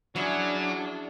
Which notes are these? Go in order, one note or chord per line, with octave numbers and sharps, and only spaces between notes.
F#3 C#4 D4 E4 G#4